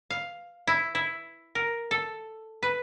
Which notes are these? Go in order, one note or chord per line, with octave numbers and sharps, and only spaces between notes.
F5
E4
E4
A#4
A4
B4